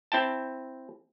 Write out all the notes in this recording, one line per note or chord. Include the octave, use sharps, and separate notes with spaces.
C4 E4 G5 A5